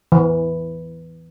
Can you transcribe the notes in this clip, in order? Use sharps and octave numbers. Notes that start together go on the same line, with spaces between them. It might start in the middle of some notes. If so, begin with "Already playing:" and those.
E3